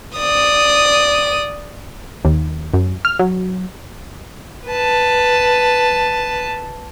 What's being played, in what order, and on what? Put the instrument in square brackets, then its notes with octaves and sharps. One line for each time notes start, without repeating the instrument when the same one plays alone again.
[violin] D5 D#6
[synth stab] D#2
F#2
F6
F#3
[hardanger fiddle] B4 A5